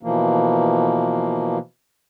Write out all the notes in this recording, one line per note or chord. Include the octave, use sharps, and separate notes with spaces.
B2 E3 F3 A#3